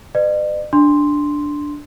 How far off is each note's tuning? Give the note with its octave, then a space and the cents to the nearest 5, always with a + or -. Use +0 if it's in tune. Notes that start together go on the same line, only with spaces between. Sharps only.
B4 +40 D5 +45
D4 +0 C6 +0